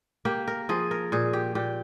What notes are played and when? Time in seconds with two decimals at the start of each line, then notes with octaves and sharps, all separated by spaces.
0.25 A#3 G4
0.48 A#4
0.69 F3 G#4
0.91 A#4
1.12 A#2 G#4
1.33 G4
1.55 A#2 G4